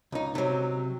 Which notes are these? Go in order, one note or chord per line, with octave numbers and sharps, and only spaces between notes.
C#2 D#4
C3 F#3